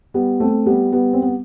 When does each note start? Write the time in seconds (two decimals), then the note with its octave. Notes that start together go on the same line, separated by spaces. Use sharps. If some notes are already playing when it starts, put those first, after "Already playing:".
0.14 G3 B3
0.40 A3 C4
0.66 G3 B3
0.92 G3 B3
1.13 C4
1.22 B3